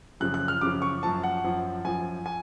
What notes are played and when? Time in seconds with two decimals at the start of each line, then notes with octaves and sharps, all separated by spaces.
0.20 F#2 C#3 F3 F#6
0.34 F#6
0.48 F6
0.61 F#2 C#3 F3 D6
0.82 C#6
1.03 F#2 F3 A5
1.23 F#5
1.44 F#2 F3
1.84 F#2 F3 G#5
2.26 G#5